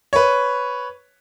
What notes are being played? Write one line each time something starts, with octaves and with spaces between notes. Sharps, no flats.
B4 C#5